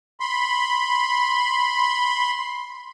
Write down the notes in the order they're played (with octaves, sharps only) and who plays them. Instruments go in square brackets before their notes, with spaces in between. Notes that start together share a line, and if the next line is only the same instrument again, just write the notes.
[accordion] B5 C6